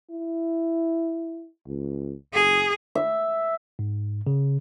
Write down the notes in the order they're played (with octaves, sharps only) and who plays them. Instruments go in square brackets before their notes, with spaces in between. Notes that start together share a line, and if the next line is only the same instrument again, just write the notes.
[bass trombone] E4
C#2
[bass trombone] F#1 [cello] G#4
[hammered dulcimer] E5
[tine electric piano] G#2
C#3